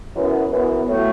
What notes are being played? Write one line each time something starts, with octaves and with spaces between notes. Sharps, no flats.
F#2 E3 B3
F#2 E3 B3
A2 F#3 A3